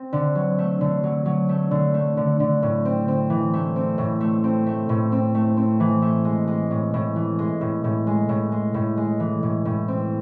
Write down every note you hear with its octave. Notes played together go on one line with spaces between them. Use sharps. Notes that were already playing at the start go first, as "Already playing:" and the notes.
Already playing: C4
D3
F#3
A3
D3
F#3
F#3
A3
D3
A3
D3
D3
A2
C4
C4
E3
A3
C4
A2
A3
C4
A3
A2
C4
A3
C4
E3
A3
G#3
G#3
A2
A2
E3
G#3
A2
A2
G#3
A2
G#3
A2
G#3
E3
A2
A2
C4